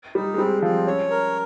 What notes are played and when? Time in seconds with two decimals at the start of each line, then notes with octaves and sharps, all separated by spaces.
0.15 G3 D#4
0.34 G#3
0.38 G3 C4
0.62 F3 C4
0.86 C#4 C#5
1.10 A#4